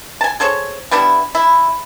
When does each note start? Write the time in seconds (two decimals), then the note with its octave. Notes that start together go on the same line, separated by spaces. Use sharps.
0.21 G#5 A5
0.40 G#4 A4 C5 C#5
0.91 G3 B3 D4 E4
1.35 E4